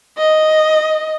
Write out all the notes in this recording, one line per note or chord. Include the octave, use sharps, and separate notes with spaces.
D#5